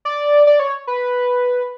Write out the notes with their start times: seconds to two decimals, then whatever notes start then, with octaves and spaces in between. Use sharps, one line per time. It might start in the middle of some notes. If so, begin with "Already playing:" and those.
0.05 D5
0.47 D5
0.60 C#5
0.87 B4